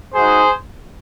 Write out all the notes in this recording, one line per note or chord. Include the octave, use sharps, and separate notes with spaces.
G#3 D#4 F#4 G#4 C5